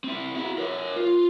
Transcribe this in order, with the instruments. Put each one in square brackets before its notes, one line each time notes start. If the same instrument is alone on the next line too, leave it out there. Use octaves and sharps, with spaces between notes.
[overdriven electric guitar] C4 E4
E4 F#4
A#4 C#5
F4